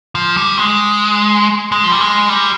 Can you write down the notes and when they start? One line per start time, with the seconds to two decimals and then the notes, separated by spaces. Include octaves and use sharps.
0.15 F3
0.37 G3
0.57 G#3
1.72 G#3
1.84 F3
1.91 G3
2.01 G#3
2.29 G3